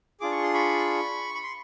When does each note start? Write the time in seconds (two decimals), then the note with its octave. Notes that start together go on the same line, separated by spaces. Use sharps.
0.20 D4 F4 G#4 D6
0.31 C#6
0.43 C6
0.54 B5 C#6
1.34 B5
1.43 C6